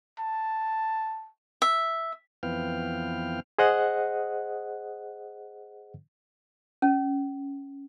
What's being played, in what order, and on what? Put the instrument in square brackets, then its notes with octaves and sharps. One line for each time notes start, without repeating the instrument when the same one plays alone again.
[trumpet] A5
[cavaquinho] E5
[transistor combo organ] F2 E3 B3 F5 G5 F6
[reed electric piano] G#4 C5 D#5 F#5 F#6
[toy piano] C#4